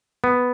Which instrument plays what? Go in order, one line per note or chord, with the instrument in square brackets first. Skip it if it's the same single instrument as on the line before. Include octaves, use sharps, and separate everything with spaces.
[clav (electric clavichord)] B3